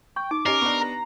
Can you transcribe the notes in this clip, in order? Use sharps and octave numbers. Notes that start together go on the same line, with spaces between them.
G5 C#6
D#4 D6
C#4 G4 A#4 D#5 C7
B3 D4 B4 C#6
A#5